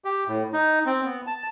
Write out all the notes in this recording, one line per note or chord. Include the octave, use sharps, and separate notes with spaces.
G4
A2
D#4
C4
B3
A5